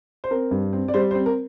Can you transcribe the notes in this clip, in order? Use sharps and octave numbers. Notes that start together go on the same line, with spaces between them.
C5
C4 A#4
G2
C4
D5
G3 C5
C5
C4
A#4